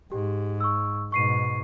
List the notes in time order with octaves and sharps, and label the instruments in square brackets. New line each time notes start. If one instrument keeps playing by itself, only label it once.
[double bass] G#2 [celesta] G4
[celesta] C#6 E6
[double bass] G#2 B2 [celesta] C#6 C7 D#7